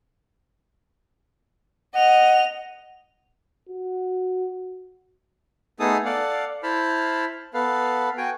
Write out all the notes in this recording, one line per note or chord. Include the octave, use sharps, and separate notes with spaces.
D#5 F#5 F7
F#4
A3 B3 D#4 G#4 A4 D#6
A4 D5 F5 F#5
E4 C5 A5 B5 F6
B3 A4 B4 F5
F#4 G5 G#5